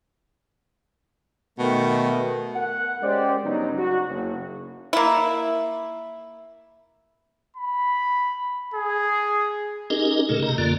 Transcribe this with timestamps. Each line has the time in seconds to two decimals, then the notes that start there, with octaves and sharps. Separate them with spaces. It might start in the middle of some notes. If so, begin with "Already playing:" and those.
1.59 B2 D#3 A3
2.54 A#4 F#5
3.02 G#3 C#4 G4 C5 D5
3.44 G2 C#3 F#3 B3 D#4
3.77 F#4
4.07 F#1
4.93 A#3 E4
7.56 B5
8.74 G#4
9.90 C#4 D#4 G4 G#4 A#4 D#5
10.29 A#2 C#3 A3 A4 A#4
10.42 C3 D#5 A#5
10.58 F#2 D3 A#3 F4 D5